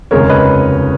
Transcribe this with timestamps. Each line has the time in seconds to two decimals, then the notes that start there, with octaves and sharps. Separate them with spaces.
0.11 F1 D#2 C#3 G#3 A#4 C#5
0.29 B4 D#5